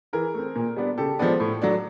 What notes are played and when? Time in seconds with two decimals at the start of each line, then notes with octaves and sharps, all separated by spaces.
0.13 E3 G#4 A#4
0.34 A3 C4
0.56 A#2
0.76 G3 B3 D4
0.98 C#3 G4 A4
1.19 F3 G#3 B3 D4
1.40 A2
1.62 F#3 A3 D4